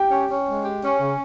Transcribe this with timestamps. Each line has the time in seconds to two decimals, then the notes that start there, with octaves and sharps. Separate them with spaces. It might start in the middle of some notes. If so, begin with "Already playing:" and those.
Already playing: G4 G5
0.11 C#4
0.30 C#4
0.47 G#3
0.64 G4
0.83 C#4
1.00 C#3